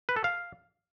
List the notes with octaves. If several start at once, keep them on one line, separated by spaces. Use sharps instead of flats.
B4
A4
F5